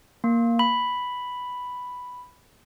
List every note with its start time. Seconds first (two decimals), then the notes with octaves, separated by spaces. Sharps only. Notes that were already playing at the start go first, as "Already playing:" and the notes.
0.24 A#3
0.59 B5